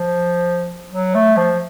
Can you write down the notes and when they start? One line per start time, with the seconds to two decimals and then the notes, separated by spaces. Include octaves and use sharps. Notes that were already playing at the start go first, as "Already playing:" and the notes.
Already playing: F3
0.91 F#3
1.15 A3
1.37 F3